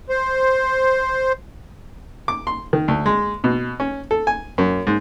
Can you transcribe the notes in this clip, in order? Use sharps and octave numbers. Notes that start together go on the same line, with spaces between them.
C5
D6
C6
D#3
D2
G#3
B2
C#4
A4
G#5
F#2
G#2